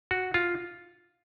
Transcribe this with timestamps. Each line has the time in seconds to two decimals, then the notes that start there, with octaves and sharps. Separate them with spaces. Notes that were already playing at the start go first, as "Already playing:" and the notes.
0.11 F#4
0.34 F4